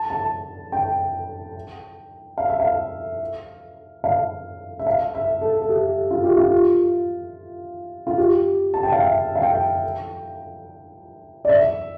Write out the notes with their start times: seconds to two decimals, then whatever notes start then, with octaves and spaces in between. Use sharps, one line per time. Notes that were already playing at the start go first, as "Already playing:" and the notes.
Already playing: A5
0.10 A5
0.72 G5
2.38 F5
2.49 E5
2.60 F5
4.04 F5
4.79 E5
4.87 F5
5.15 E5
5.41 A4
5.62 A4
5.69 G4
6.11 F4
6.24 G4
6.37 F4
8.07 F4
8.18 G4
8.74 A5
8.83 G5
8.92 F5
9.01 E5
9.36 F5
9.42 G5
11.45 D5
11.49 E5